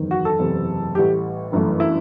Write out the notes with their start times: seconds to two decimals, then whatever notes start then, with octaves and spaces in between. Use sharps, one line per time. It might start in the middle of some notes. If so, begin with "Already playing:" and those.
Already playing: F#1 E2 D#3
0.11 F#4
0.25 A4
0.39 F#1 E2 C3
0.95 A1 A2 G3 G4
1.52 G1 F#2 E3 A3
1.80 E4